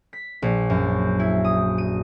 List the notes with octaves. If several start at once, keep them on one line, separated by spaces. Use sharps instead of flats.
B6
A#1
F#2
E4
D#6
D#7